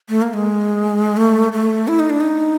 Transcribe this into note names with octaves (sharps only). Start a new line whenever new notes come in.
A3
A#3
G#3
A3
A3
E4
D#4
D4
D#4